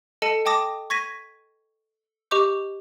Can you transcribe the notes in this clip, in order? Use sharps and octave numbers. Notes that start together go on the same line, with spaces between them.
A4 D#5 A5 C#7 D#7
D#5 G5 A5 D6 D#6 A#6
C#6 G#6 A#6 B6 D#7
G4 D#5 C#6 D6 G6